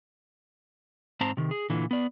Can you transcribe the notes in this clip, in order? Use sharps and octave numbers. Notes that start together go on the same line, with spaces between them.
G#2 C4 C5 A5 A#5
C3 D#3
G#4
A#2 D3 E3
B3 D5